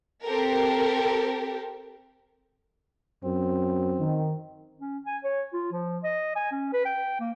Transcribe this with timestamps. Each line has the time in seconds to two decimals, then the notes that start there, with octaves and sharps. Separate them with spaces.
0.24 C4 G4 A4 A#4
3.24 F#2 C4
4.00 D#3
4.80 C#4
5.06 G#5
5.24 C#5
5.53 F4
5.72 F3
6.04 D#5
6.36 G#5
6.52 C#4
6.73 B4
6.85 G5
7.20 A#3